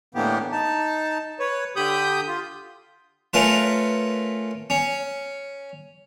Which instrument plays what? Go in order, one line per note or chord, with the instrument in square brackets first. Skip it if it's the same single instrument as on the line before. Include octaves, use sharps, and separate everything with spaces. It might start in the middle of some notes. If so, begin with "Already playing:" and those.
[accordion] A2 D3 E3 A#3 B3 G4
D#4 A5
B4 C#5
D3 G4 B5 D#6 G6
F4
[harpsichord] A3 C#4 F4 A#4 B4
C#4